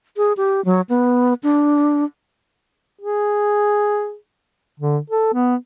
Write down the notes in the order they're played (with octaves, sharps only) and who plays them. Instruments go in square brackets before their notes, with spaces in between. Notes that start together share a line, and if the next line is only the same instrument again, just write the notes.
[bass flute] G#4
G4
F#3
B3
D4
[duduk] G#4
D3
A4
B3